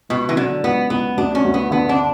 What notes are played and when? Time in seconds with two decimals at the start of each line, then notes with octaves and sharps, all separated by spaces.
0.09 C#2 B2
0.29 E3
0.36 D3 F#3
0.64 C#2 B3
0.90 C#2 B3
1.17 D2 D4
1.35 C#4
1.45 D2
1.54 B3
1.71 D3 B3
1.89 D4